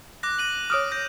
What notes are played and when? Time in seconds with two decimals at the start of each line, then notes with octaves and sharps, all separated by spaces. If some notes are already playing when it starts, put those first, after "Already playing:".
0.23 D6 F#6 A#6
0.39 A#6 D#7 F#7
0.70 C#5 D6 D#6 F6 D7
0.92 G6 A#6